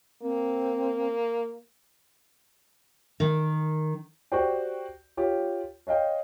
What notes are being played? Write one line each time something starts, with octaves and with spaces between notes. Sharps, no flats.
A#3 C4
D#3
F#4 G4 C5 D5 G5
F4 G4 C#5
C#5 D#5 F5 G5